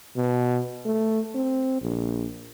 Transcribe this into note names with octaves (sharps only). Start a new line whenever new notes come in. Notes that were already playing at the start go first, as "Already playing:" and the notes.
B2
A3
C4
A#1